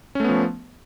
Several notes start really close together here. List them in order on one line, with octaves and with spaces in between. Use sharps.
C#4 A3 B3 F3